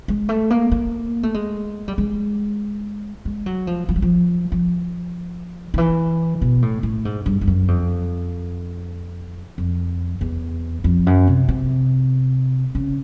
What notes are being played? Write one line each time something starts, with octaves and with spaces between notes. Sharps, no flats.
G#3
A3
A#3
A#3
A3
G#3
G3
G#3
G#3
F#3
F3
F3
F#3
F3
F3
D#3
E3
B2
A2
A2
G#2
G2
G2
F#2
F2
F2
E2
F2
F#2
C3
C3
C#3